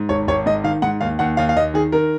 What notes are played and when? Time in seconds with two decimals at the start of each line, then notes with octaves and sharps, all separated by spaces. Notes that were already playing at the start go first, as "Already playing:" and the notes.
Already playing: G#2
0.09 G#1 C#5
0.27 G#1 C#5
0.46 G#2 D#5
0.64 D#3 F5
0.82 G#2 F#5
1.01 D#2 F5
1.19 D#2 F#5
1.37 D#2 F5
1.49 F5
1.56 D#2 D#5
1.74 D#3 G#4
1.92 D#3 A#4